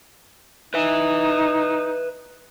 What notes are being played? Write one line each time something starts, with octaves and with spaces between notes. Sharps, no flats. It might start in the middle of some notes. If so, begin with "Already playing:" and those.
D#4 B4 E5